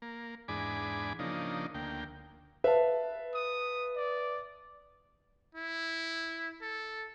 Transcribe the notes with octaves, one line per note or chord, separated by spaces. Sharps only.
A#3
E2 G#2 D4 G#5 B5 D6
C#3 F3 A#3 D4 D#4
D2 A#3 G5
B4 E5 F5 A5
D#6
D5
E4
A4